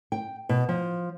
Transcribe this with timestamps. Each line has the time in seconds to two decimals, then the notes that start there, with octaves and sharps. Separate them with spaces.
0.12 G5
0.49 B2
0.69 F3